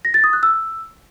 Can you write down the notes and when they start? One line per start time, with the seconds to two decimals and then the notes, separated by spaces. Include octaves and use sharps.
0.05 A#6
0.14 A6
0.24 D#6
0.33 F#6
0.43 E6